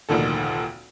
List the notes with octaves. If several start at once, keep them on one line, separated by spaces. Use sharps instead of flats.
F1 D2 A#2 D#3 A4